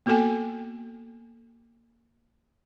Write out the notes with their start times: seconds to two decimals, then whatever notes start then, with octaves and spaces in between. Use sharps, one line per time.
0.06 A#3 B3 F#4 A4 G5 G#5